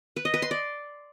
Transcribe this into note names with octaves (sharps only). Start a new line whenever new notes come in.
B4
D#5
B4
C6
D5